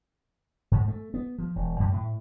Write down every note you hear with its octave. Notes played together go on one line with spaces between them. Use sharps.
G#2
A3
B3
F3
E1
F#2
A2